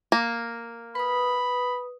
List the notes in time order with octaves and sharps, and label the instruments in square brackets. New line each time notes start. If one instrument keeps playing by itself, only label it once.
[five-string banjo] A#3
[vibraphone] B4 D#6 [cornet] B5